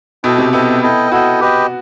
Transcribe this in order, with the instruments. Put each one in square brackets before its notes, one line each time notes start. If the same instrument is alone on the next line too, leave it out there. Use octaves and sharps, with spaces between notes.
[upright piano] B2 [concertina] E4 A4 D#5 G5
[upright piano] C3
[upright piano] B3 [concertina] E4 A4 D#5 G5
[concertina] E4 A4 D#5 G5
[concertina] E4 A4 D#5 G5 [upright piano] F#4
[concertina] G4 B4 D#5 G5